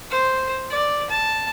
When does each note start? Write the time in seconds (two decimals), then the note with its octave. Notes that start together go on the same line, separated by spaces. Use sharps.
0.11 C5
0.70 D5
1.10 A5